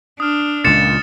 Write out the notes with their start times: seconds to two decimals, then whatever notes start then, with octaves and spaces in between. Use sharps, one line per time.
0.20 D4 D#6 F6
0.64 C#2 A#2 A6 C#7 E7